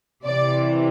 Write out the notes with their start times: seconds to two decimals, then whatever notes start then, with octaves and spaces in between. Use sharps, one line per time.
0.24 C3 E3 D5